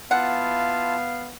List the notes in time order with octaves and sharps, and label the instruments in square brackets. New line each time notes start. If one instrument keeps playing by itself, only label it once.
[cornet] B3 [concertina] E4 F4 A5 [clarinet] F5 [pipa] F#5